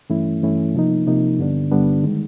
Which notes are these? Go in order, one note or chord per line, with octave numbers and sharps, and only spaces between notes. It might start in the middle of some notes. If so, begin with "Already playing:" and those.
G2 E3 A3 C#4 E4
G2 E3 A3 C#4 E4
C3 F3 A#3 D#4
C3 F3 A#3 D#4
G2 D3 G3 B3 D4
G2 D3 G3 B3 D4
D#3 G#3